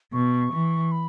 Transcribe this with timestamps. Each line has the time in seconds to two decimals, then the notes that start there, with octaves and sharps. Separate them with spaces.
0.13 B2 C#6
0.53 E3
0.92 B5